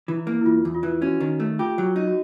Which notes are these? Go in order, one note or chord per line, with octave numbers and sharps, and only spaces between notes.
E3
E4
A#3
E4
E2 F4
E2
F4
E3
C#4 F#4
D#3
A3
F4 G4
F#3
D#4
F#4